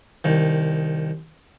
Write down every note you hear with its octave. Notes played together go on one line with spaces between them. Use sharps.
C2 D#3